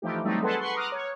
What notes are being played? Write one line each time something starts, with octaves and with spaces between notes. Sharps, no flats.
E3 F3 A3 D#4 G4
F#3 G3 A3 C4 D#4
G#4 A4 B4 F#5 A5 C6
B4 F#5 C6 C#6
A#5 D6 D#6 F6 F#6
C#5